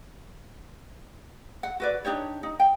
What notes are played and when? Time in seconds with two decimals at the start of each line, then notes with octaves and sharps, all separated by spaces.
1.63 F#5
1.80 F#4 B4 D5
2.05 D4 D#4 G4 C#5
2.43 D#4
2.60 G5